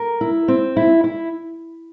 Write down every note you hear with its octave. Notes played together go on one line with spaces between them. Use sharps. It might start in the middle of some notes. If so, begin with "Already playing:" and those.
Already playing: A#4
E4
C4
E4
E4